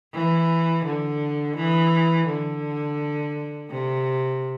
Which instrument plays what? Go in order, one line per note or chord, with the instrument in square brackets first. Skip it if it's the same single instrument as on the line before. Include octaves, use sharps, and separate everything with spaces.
[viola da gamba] E3
D3
E3
D3
C3